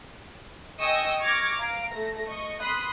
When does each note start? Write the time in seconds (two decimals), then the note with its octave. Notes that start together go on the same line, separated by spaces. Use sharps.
0.80 D#5 G5 G#5 C#6 D#6 E6
1.20 C#6 D6 F6 G#6 A#6
1.60 F5 A#5 D7
1.93 A3 A#6
2.28 D#5 C#6
2.59 B5 C6 D#6 F#6